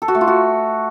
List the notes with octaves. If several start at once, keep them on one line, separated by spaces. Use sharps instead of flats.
A4
F#4
A3
F4
F#4